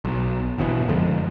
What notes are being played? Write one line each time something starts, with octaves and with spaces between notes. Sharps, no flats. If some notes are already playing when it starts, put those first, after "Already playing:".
B1
G1 B2 E3
F#2 D3 F3 G#3